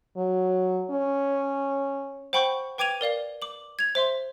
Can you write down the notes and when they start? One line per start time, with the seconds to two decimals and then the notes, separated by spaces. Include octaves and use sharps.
0.17 F#3
0.90 C#4
2.33 C5 F#5 G5 B5 C#6 G6
2.78 B4 G5 D6 G#6 D#7 F7
3.01 A#4 D5 F5 G7
3.42 D6 F#7
3.79 G#6 F7
3.95 C5 E5 C6